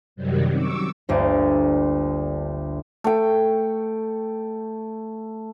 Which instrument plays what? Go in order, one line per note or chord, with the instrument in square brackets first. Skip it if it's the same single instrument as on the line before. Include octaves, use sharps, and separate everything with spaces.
[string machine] F#2 C3 D#3 F#3 G3
C#6 D6 E6
[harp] G1 D2 A#3 D5
[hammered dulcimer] A3 G5